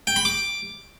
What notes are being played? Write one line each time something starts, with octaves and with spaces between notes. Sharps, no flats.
G5
B5
D6